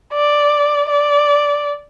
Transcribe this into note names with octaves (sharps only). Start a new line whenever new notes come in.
D5
D5